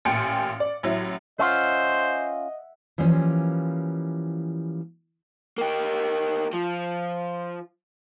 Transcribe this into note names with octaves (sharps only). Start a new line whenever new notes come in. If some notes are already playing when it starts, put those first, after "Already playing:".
A1 A#2 G5 G#5 C#7 D7
D5
A1 F#3 E4
C#4 F4 C5 D#5 E5 F#5
E3 F3 G3 A#3 C#4
A#3 G4
F3